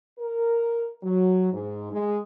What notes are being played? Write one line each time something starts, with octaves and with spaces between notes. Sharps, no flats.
A#4
F#3
G#2
G#3